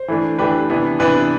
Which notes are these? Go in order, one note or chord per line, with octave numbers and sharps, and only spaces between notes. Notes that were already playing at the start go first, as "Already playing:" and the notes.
Already playing: C5
E3 A3 D4
E3 A3 D4 G4 B4
C3 E3 B3 D4
C3 E3 B3 D4 B4 D5